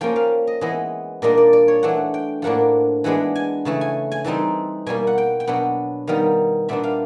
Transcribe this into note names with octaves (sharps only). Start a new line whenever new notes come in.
F3 A#3 C#4 G5
F5
D#5
E3 G#3 B3 D#5
A#2 G3 A#3 D4 D#5
D5
D5
C#5
E3 A3 D4 F#5
G5
A2 F3 A#3 D4 F#5
E3 G#3 B3 D4 F#5
G#5
C#3 E3 A3 A5
G#5
G#5
E3 G3 C4 D#4 A5
B2 G3 A#3 G#5
F#5
G5
G5
B2 F#3 B3 D4 F#5
D#3 G3 B3 D#4 F5
A#2 G3 B3 D4 E5
F5